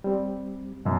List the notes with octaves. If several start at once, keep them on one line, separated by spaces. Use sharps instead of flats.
G3 C4
F#2 B2